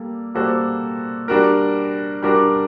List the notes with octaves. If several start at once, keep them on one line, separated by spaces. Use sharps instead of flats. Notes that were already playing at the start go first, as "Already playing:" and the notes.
Already playing: G3 A#3 A4
G3 A#3 F#4 A4 C5
G3 D4 F#4 A#4
G3 D4 F#4 A#4